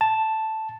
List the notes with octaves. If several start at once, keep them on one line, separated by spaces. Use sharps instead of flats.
A5